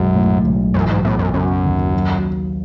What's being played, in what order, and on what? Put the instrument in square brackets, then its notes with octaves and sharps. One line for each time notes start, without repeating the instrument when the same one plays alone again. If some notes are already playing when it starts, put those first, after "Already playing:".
Already playing: [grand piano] B1 G#3 [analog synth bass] F#2
[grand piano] A2
B1
[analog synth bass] F#2 [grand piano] E3
[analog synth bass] G#2
[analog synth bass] A2 [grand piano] B3
[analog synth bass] F#2
[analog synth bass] F#2 [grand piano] C#3
[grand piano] D#2
F#3